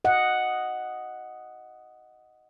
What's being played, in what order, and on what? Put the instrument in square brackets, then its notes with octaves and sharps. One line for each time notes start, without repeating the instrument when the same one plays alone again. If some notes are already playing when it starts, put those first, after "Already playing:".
[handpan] D#5 F#5